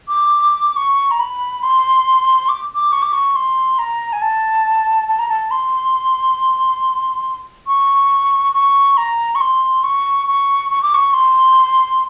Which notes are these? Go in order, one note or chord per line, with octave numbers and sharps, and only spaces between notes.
D6
C#6
A#5
B5
C6
D6
D6
C#6
D6
C#6
C6
A#5
G#5
A5
A5
A#5
A5
C6
C#6
C#6
A#5
C#6
C6
C#6
C#6
C#6
D6
C#6
C6